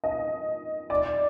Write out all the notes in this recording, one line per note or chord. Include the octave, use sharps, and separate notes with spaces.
D#5
D5